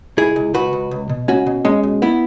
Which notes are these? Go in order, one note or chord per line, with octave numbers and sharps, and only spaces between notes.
C#2 E4 G#4
C#2
C#2 F#4 B4
C#2
C#2
B2
C#2 C#4 F#4
B2
B2 G#3 C#4
B2
B3 E4